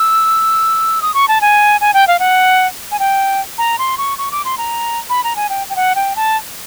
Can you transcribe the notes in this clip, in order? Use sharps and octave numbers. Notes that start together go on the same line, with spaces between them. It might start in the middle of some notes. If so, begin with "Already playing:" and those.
Already playing: E6
D#6
C#6
A5
G#5
G#5
G5
F5
F#5
G#5
G5
A#5
C6
C#6
C#6
D6
C6
A#5
B5
A#5
G#5
G5
G5
F#5
G5
A5